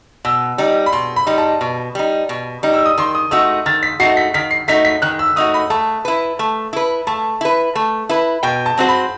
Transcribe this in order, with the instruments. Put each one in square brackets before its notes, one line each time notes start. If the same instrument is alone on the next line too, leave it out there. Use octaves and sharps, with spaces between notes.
[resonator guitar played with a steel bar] B2 [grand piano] E6
[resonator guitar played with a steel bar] G3 D#4
[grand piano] B5
[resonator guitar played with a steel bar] B2 [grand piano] C6
[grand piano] B5
[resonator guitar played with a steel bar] G3 D#4
[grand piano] A5
[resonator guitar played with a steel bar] B2
G3 D#4
B2
G3 D#4
[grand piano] E6
D#6
[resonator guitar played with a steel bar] D#3 [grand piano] C6
[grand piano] D#6
[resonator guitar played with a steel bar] A3 D#4 F#4 [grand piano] E6
[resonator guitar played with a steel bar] D#3 [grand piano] A6
[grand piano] B6
[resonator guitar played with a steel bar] A3 D#4 F#4 [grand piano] C7
[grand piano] B6
[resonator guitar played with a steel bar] D#3 [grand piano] B6
[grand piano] C7
[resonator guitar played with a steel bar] A3 D#4 F#4 [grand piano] B6
[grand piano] B6
[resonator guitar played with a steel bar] D#3 [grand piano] F#6
[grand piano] E6
[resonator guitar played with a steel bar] A3 D#4 F#4 [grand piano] D#6
[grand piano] B5
[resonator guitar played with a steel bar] A3 [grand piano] A5
[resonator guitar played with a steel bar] E4 B4
A3
E4 B4
[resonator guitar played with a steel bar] A3 [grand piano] A5
[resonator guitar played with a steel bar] E4 B4
A3
E4 B4
[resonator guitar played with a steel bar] B2 [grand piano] G5
[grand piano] A5
[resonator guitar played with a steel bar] F#3 C4 F#4 C5
[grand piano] B5